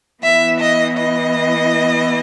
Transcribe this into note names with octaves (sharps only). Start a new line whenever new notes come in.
E3 B3 E4 E5
D#5
D#5